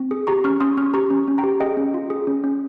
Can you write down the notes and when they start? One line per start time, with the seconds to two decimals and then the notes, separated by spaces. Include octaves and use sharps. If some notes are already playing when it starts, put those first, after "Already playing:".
Already playing: C4
0.11 G#4
0.27 G4 A#5 C#6
0.44 C#4 C#6 F6
0.60 C#4 C6 D#6
0.77 C#4 C#6 F6
0.94 G4 A#5 C#6
1.10 C#4
1.28 C#4
1.38 G5 A#5
1.44 G4
1.60 G#4 D#5 G5
1.77 C#4
1.94 F4
2.10 G#4
2.27 C#4
2.44 C#4